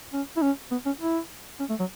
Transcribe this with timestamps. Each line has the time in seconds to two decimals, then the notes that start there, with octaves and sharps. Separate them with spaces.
0.13 C#4
0.37 E4
0.42 C#4
0.71 B3
0.86 C#4
1.01 E4
1.59 C#4
1.70 A3
1.80 F#3